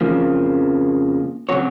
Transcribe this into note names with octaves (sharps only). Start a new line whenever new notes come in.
F2 C#3 F3 A#3
C#3 F#3 C4 F#4 C#5